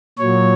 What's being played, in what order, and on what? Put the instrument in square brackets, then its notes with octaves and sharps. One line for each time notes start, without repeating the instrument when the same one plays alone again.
[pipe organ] A#2 F#3 C#5